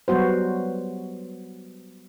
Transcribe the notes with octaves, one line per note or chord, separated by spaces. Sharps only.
F#3 G3 B3 F#4 C5